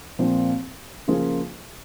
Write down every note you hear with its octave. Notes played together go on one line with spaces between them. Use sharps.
A#2 F3 C4
C#3 F3 A#3 F4 G#4